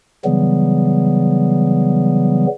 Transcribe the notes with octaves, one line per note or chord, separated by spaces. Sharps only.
C#3 E3 F#3 G3 B3